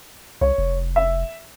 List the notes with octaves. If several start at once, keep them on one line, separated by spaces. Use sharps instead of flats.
C2 C#5
F1
E5